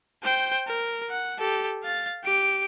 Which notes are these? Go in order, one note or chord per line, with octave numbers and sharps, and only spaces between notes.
C5 G5
A#4
F#5
G4 A4
F5 A6
G4 D7